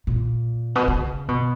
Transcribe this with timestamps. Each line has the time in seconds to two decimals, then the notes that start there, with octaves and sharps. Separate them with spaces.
0.07 A#2
0.75 B2
0.88 C#3
1.28 B2